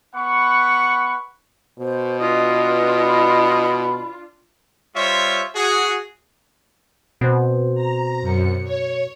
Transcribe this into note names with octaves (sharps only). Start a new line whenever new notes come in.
B3 F#5 B5 C#6
B2 C5
D4 F4 B4 D#5
B5
G3 F4 C5 C#5 E5
F#4 G#4
B2 C4 C5
A#5
F#2 C#7
C#5